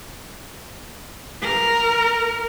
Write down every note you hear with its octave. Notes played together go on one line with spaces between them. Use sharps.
A#4